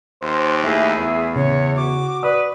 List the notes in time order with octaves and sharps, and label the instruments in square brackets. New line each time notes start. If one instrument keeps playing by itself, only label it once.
[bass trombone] D#2 [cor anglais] C5
[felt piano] A3 [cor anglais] E4 [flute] G#4
[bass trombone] E2
[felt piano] C#3 [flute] C#5
[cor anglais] F#4 [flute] D6
[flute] B4 [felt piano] D5 D#6